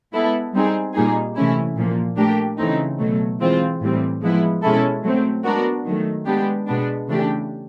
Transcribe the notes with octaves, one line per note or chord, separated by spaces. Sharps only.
G#3 B3 E4 A4
G3 C4 D#4 G#4
A#2 G3 A#3 D#4 G#4
C3 E3 A3 C#4 E4
A#2 F3 A#3
A3 D4 G4 A#4
C#3 E3 A3 C4 D#4
B2 F#3 A3
E3 G#3 C4 F4
A2 E3 G3 C4
F3 G#3 B3 E4
B2 G#3 C#4 E4 A4
F#3 A3 C4
G#3 B3 D4 F#4 A#4
D#3 F#3 A3
G#3 B3 D4 G4
B2 G#3 B3 D4
C#3 E3 A3 D4 G4